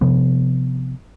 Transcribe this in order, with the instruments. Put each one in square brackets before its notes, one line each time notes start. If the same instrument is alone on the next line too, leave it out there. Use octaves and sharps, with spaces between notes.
[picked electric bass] C3 F3 B3